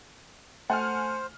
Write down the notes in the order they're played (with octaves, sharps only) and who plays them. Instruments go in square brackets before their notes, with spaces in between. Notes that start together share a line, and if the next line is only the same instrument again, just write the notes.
[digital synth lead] A3 [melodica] C5 [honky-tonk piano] F#5 G#5 F6